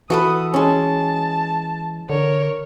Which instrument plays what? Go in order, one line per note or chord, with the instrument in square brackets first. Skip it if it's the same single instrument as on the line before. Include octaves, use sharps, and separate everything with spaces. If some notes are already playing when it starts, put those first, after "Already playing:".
[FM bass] E3 [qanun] F#4 A4 B4 [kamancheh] D#6
[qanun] G#3 C#4 [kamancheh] A5
[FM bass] D3 [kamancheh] A#4 C#5